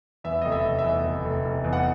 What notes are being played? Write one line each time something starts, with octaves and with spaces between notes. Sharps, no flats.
E2 E5
F1 D#5
E5
F1
E5
E2
F1
F1
F1
E2
F#5